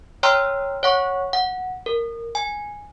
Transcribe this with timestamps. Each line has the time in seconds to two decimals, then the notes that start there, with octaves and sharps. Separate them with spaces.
0.23 C#5 G5 A#5 C6 E6 F6
0.83 C#5 F#5 C#6
1.33 F#5
1.86 A#4
2.35 G#5